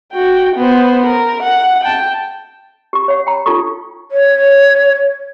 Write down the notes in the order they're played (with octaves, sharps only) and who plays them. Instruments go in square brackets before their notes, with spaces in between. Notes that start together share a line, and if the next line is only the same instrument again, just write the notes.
[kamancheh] F#4 G5
B3 C5
A#4
F#5
G5 A5
[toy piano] G4 C#6
C#5 F#5
G5 A#5
D4 D#4 F4 G4 A4 C#6
[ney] C#5